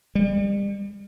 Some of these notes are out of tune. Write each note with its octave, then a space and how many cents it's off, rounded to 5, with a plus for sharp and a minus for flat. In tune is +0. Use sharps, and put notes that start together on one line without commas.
G3 +35